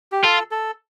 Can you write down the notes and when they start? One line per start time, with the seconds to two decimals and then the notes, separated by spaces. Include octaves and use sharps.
0.12 G4
0.23 F4 A4
0.51 A4